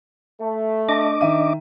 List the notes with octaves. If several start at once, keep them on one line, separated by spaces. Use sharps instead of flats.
A3
D4 D#5 D6
D#3 E5 D#7